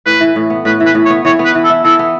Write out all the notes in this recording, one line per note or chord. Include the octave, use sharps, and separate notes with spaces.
A2 B4
E3
A2
B3
A2 B4
E3
B4
A2
C#5
B3
E3 C#5
B3
B4
E3
A4
E4
E3 A4
B3